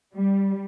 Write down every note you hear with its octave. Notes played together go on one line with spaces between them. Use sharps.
G3